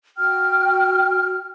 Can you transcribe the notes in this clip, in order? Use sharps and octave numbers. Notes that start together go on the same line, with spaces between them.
F#4 G5 F6